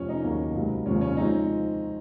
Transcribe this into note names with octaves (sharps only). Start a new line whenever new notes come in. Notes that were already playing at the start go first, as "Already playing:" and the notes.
Already playing: F1 F2 C#4
D#4
D#2 C#3 F#3 A#3
C#2 C3 F#3 A#3
F1 D#2 C#3 F3 G#3 C#4
C#4
F3 G#3 C4 D#4